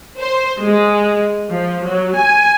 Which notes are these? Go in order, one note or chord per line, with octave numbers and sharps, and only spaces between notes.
C5
G#3
F3
F#3
G#5